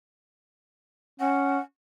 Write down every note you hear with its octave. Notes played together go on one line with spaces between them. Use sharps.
C#4 F#5